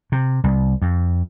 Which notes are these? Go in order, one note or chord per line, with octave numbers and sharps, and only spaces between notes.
C3
C2
F2